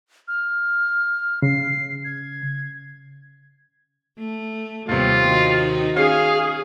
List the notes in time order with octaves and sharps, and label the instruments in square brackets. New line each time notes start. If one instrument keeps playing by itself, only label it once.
[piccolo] F6
[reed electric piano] C#3 [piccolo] C7
[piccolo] G#6
[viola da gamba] A3
[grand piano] D#2 C3 [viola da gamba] G3 B3 [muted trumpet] F4
[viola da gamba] D#3 D#4 F#4
[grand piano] C#4 [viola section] G#4 [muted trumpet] F5